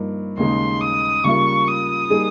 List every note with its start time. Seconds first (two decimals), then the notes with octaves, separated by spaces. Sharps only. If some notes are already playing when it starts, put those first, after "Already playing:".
Already playing: G2 F3 A#3 D#4
0.37 D#2 C#3 G#3 D#4 C6
0.81 D#6
1.24 C#3 G3 A#3 F4 C#6
1.67 D#6
2.10 G3 A#3 D#4 G#4